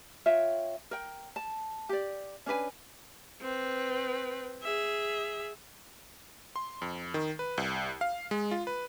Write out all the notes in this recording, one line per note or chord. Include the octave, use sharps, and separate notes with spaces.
F4 C#5 E5 G5
A#4 G5
A5
G4 D5
C#4 D4 B4 G#5
C4 B4
G#4 E5
C6
F2
D#3
B4
C2
F5
G#3
F4
B4